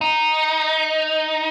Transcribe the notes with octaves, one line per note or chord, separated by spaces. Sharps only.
D#4